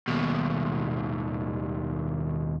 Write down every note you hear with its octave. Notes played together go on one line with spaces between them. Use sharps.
D#2 B2